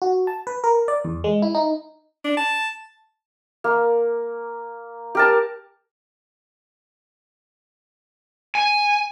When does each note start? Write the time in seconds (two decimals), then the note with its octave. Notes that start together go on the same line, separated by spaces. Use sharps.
0.02 F#4
0.27 A5
0.47 B4
0.64 A#4
0.88 D5
1.04 E2
1.24 G#3
1.42 E4
1.55 D#4
2.24 D4
2.37 A5
3.64 A#3
5.15 G4 A#4 A5
8.55 G#5